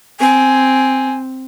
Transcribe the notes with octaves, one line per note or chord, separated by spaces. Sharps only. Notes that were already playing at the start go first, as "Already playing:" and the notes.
C4 G#5